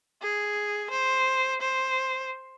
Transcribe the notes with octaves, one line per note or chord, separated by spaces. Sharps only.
G#4
C5
C5